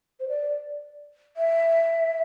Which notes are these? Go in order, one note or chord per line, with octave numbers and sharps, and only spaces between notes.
C5
D5
E5